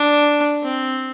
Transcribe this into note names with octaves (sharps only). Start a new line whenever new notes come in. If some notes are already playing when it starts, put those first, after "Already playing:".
Already playing: D4
C4